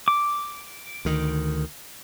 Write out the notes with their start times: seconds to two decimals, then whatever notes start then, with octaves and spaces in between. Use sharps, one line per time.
0.08 D6
1.05 D2 D#3